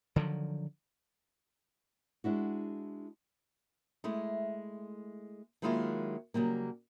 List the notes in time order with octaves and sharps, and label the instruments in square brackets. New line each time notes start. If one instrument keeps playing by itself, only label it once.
[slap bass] D3 D#3 F3 F#3
[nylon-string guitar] G#3 D4 E4 F#4
G#3 A3 E4
D#3 F#3 G#3 A#3 E4 F4
C#3 F#3 G3 A#3